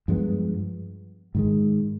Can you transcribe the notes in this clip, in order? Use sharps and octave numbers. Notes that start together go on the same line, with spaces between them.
G2 F3 G#3 B3
G#2 D#3 G#3